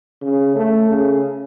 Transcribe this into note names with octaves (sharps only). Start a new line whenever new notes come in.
C#3
A3
C#3